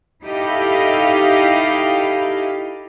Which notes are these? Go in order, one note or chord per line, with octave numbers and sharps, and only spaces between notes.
D#4 E4 G4 A4 D#5 F5